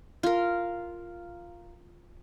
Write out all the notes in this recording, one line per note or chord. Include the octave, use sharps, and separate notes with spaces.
F4 A#4